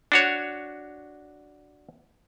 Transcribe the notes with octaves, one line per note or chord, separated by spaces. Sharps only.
D4 F#4 C#5